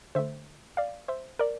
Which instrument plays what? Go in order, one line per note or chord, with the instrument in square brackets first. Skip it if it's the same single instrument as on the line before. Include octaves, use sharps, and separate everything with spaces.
[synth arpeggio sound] D3 A3 C5 E5
D5 F5
C5 E5
A#4 D5